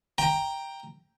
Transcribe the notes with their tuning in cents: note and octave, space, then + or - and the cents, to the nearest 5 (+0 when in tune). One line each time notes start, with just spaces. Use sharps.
G5 +10 A#5 +0